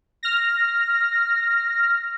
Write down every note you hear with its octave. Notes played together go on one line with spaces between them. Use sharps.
F6 A#6